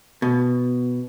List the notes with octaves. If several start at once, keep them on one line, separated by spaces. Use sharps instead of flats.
B2